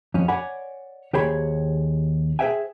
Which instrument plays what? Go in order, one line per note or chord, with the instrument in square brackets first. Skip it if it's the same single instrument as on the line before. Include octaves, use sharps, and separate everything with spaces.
[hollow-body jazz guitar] F2 C#4
C#5 D5 F#5 G#5 B5
D#2 G4 G#4 C5 C#5 B5
G#4 B4 C5 E5 G5 G#5